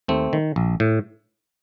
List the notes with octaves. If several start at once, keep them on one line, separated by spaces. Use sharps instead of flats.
D#2 A3 C4
D#3
A#1
A2